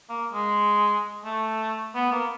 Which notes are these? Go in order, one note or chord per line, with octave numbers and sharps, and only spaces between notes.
A#3
G#3
A3
B3
A#3